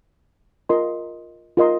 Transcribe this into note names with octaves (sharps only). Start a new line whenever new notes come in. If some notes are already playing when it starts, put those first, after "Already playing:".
F4 A#4 D#5 C6
F4 A#4 D#5 C6